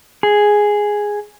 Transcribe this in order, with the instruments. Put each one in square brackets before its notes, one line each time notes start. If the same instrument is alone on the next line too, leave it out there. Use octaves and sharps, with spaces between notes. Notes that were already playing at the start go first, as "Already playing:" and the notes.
[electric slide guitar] G#4